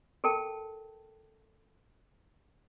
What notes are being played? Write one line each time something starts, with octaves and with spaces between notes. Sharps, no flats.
A4 A#4 G5 A5